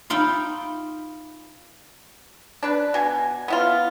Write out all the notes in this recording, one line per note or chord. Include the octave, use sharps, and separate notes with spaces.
D#4 F4 E5 G5 B5
D4 B4
B2 G#5
B3 E4 F4